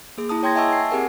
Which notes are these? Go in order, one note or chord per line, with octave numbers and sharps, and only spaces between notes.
A#3 G#4
E4 A5 D#6
C#5 G5 C6 G#6 A#6
D#5 E5 G#5 A5 C#6 E6
C7
C4 G4 G#4 A#4 F#5 G#5